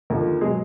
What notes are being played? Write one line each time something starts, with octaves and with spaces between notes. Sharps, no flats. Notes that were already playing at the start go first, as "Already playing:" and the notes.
D#2 D3 F3
B2 F#3 G#3 G#4